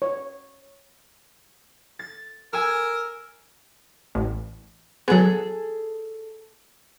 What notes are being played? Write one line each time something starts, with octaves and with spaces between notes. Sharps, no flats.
C#5
A6
A#4 G#5 E6
A1
F#3 B3 G#4 A4